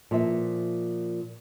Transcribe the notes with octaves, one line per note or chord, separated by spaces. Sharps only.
A#2 F3 C5 E5